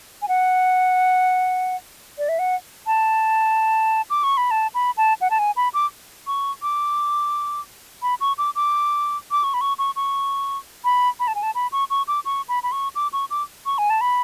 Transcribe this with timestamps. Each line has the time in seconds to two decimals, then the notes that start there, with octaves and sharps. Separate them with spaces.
0.22 G#5
0.28 F#5
2.18 D5
2.29 E5
2.39 F#5
2.87 A5
4.10 D6
4.24 C#6
4.37 B5
4.51 A5
4.74 B5
4.97 A5
5.21 F#5
5.30 A5
5.39 G#5
5.56 B5
5.74 D6
6.27 C#6
6.62 D6
8.02 B5
8.21 C#6
8.38 D6
8.55 D6
9.31 D6
9.44 C#6
9.54 B5
9.61 C#6
9.79 C#6
9.96 C#6
10.84 B5
11.20 B5
11.28 A5
11.35 G#5
11.43 A5
11.55 B5
11.72 C#6
11.90 C#6
12.08 D6
12.25 C#6
12.49 B5
12.63 B5
12.72 C#6
12.95 D6
13.13 C#6
13.30 D6
13.66 C#6
13.78 G#5
13.90 A5
14.01 B5